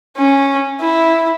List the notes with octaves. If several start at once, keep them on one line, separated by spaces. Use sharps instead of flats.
C#4
E4